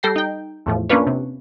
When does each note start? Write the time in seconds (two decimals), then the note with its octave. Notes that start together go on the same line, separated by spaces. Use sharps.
0.03 G3 A4 G5 A#6 C7
0.16 D#4 G5
0.66 E2 A2 F3
0.90 A#3 C#4 D4 F4 B4 C#5
1.07 C3